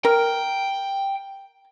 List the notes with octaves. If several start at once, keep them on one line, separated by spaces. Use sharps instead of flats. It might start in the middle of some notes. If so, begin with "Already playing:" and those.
A#4 G5